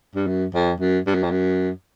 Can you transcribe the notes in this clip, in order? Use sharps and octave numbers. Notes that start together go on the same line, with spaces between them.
G2
F#2
F2
F#2
G2
F#2
F2
F#2